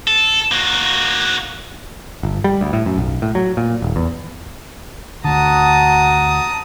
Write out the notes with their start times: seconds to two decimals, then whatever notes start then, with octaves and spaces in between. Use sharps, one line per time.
0.07 A4
0.52 A#3 F#4
2.23 G1
2.44 G3
2.61 D2
2.73 A2
2.86 F#2
2.98 B1
3.22 A2
3.35 F#3
3.57 A#2
3.82 D#1
3.96 E2
5.25 D2 D3 F#4 A5 A#5 D#6